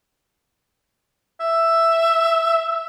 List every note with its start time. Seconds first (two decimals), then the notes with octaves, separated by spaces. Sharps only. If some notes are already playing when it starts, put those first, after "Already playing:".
1.41 E5